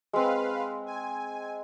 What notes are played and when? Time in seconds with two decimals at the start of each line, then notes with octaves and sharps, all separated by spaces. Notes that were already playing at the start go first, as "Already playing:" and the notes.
0.13 G#3 C4 B4 F5
0.86 G#5